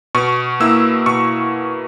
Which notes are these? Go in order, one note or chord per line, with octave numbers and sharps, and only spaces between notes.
B2 C#6
A#3 E4 E6
B2 C#6